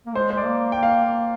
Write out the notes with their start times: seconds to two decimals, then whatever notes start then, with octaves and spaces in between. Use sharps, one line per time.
0.07 A#3
0.15 G#3 C5
0.30 C5
0.37 D5
0.45 A#3
0.72 A#3 G5
0.83 F5
1.06 A#3